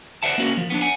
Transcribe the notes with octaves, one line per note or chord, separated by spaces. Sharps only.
B4 C5 D5 E5 F#5 A5
A#3 C#4 F#4 A#4
F3
B3 C#4 D4
F#5 G#5